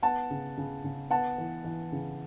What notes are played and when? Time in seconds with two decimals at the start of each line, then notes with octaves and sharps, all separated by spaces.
0.03 B3 F#5 A5
0.30 C#3
0.58 C#3
0.84 C#3
1.10 B3 F#5 A5
1.38 E3
1.64 E3
1.92 C#3